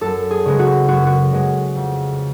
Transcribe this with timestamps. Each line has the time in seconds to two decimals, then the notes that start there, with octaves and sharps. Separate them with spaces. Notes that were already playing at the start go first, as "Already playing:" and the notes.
0.01 F#2 A4
0.31 G#4
0.46 C#3 G#3 B3
0.59 F#4
0.88 F#2 F#4
1.06 F#4
1.32 C#3 G#3 B3
1.75 F2